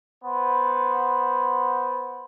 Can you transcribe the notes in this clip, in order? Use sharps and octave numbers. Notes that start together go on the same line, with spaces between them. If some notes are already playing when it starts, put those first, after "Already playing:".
B3 C5